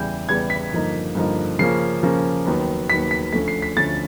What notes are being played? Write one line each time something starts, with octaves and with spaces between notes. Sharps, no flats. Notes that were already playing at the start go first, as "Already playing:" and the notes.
Already playing: E2 C#3 E3 G3 B3 G6
E2 C#3 E3 G3 B3 G#6
B6
G2 D3 F3 A#3 D#4
G2 D3 F3 A#3 D#4
C#3 F3 A#3 C#4 C7
C#3 F3 A#3 C#4
D#2 D#3 F#3 B3
D#2 D#3 F#3 B3 B6
B6
D2 D3 F3 A3 C#4 B6
C7
B6
D2 D3 F3 A3 C#4 A6